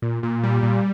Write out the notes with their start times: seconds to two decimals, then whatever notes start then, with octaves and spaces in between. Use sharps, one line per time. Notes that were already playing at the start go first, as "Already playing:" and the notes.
0.02 A#2
0.23 A#2
0.44 G3
0.63 A#2